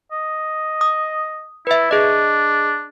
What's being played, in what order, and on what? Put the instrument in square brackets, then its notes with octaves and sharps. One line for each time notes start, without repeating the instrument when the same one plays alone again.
[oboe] D#5
[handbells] D#6
[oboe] E4 [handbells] B4 E5
[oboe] D4 [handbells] G#4 D#5